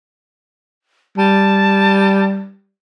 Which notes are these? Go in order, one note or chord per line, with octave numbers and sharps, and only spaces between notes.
G3 A5